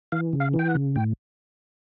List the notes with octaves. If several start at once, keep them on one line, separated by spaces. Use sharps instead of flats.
E3 F5
C#3
F5
E3
G5
F#5
C#3
A2 G5